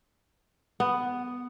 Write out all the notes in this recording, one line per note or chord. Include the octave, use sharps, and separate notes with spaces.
B3